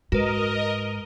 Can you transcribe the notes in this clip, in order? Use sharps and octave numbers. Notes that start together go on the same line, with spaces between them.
G#2 F#4 A#4 B4 D#5